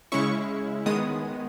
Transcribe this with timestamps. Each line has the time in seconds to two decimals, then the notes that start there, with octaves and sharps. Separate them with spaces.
0.12 C#3 G#3 C#4 E4 C#6
0.86 D#3 G#3 B3 D#6